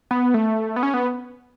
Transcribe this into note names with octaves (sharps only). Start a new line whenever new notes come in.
B3
A3
B3
C#4
B3